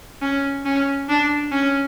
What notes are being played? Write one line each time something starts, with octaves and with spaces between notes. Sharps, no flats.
C#4
C#4
D4
C#4